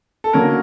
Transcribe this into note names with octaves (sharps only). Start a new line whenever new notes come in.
A4
D3 F#3 A#3 C#4 A#4